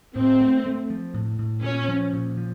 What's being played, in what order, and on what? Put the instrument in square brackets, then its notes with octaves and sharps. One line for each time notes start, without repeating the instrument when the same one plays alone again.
[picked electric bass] A2 [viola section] C4
[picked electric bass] A3
A3
F3
A2
A2
[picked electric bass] A#2 [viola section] C#4
[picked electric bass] F3
A#2
F3